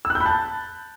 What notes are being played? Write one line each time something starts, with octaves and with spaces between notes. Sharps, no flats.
E6
F#6
G6
B5
A5